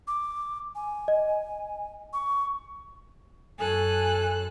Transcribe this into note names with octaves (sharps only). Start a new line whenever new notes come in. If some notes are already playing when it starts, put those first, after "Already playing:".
D6
G#5
D#5
C#6
F#2 A4 G#5 F#6